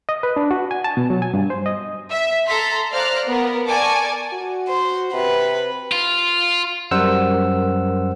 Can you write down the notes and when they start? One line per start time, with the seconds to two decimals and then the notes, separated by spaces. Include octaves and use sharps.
0.09 D#5
0.23 B4
0.36 D4
0.51 F#4
0.71 G#5
0.84 A5
0.97 B2
1.10 F#3
1.22 G#5
1.34 G2
1.50 C5
1.66 D#5
2.10 E5
2.47 A4 A#5 C6 B6
2.92 C5 D5 F5 A#5 F6 F#6
3.27 B3 A#4
3.67 A#4 D5 G#5 A5 C#6 D6
4.33 F#4
4.69 C5
5.13 C3 B4
5.92 F4
6.91 F#2 G3 A#4 C5 F#5 E6